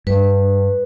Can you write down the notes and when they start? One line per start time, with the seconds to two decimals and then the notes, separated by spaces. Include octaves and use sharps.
0.07 G2 B4